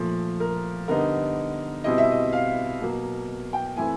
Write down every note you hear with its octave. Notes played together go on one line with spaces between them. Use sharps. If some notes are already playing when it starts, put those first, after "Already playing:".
Already playing: A#2 F3 A3
A#4
D3 G3 B3 D#4 A#4
B2 G3 C4 E4 D#5
E5
D#5
F5
B2 F#3 A#3
G5
E3 A3 C4 E4 G#5